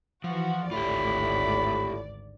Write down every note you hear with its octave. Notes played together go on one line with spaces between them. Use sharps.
E3 F3 F#4
G#1 D2 A2 F4 G4 D5 B5